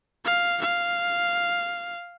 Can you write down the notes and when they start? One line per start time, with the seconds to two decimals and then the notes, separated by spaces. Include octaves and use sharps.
0.25 F5
0.61 F5